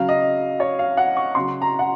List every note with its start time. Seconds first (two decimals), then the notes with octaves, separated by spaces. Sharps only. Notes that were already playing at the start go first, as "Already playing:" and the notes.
Already playing: C#3 F#3 F5
0.09 D#5
0.60 C#5
0.79 F5
0.97 F#5
1.17 C#6
1.35 C#3 F#3 C6
1.62 A#5
1.79 F#5